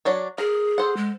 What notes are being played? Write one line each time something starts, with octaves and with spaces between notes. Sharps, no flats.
F#3 D4 C#5
G#4 A#4
A4 C5 F#5
G#3